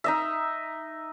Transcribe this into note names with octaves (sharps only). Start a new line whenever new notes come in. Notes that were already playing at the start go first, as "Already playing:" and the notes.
D#4 D#5 E5